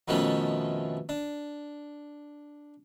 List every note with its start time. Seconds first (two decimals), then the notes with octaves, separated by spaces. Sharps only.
0.08 F2 B2 D#3 F3 A3 C#4
1.09 D4